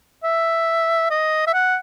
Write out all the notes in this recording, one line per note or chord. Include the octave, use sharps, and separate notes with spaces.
E5
D#5
E5
F#5